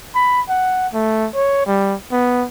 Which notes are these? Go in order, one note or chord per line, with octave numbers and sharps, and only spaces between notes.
B5
F#5
A3
C#5
G3
B3